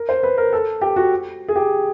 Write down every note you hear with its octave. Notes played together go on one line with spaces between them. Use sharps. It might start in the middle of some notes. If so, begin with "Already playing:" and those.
Already playing: A#4
C5
B4
A#4
A4
G4
F#4
G#4
G4